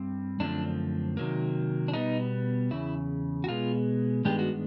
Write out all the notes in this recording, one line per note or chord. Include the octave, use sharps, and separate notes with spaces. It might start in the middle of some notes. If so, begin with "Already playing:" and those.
Already playing: G2 G3 C4
F#2 D3 F3 A3 C4 D4
C3 D#3 F#3 A#3
D4
B2 G3 B3 D#4
E2 C#3 E4
F#4
B2 G#3 B3 F4
G2 D#3 G#3 B3 D4 G4
F#4